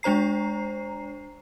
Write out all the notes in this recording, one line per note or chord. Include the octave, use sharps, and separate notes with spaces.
G#3 D4 C5 A#5 C7